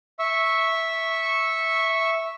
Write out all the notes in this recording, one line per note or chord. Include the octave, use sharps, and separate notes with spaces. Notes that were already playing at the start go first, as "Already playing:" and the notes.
E5 C#6 E6